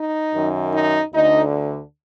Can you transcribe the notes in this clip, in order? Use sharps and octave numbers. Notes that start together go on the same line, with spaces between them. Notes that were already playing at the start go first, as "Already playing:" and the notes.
Already playing: D#4
F#2 D#3
D#4
D2 D3 D#4